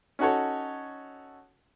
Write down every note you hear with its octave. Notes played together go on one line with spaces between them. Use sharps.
C#4 D#4 F#4 A4 C#5